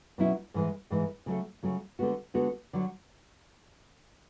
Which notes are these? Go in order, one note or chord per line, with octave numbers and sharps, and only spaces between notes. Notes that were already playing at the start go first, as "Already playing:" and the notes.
B2 F#3 C#4 E4
G#2 E3 G#3
G#2 E3 G#3
C#3 F#3 A3
C#3 F#3 A3
D3 G#3 B3 F#4
D3 G#3 B3 F#4
D3 F#3